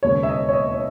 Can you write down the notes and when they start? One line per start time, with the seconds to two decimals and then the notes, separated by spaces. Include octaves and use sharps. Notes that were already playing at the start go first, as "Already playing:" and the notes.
0.03 E1 D#2 C#3 C#5
0.23 E5
0.29 D#5
0.49 C#5
0.53 D#5
0.74 C#5